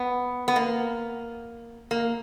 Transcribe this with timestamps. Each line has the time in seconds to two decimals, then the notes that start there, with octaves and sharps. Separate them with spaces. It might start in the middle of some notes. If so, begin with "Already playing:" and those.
Already playing: B3
0.48 B3
0.56 A#3
1.91 A#3